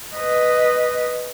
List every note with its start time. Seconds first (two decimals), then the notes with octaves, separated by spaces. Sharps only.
0.15 B4 D#5